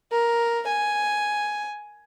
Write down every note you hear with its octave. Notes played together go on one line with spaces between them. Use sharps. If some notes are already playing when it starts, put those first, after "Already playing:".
A#4
G#5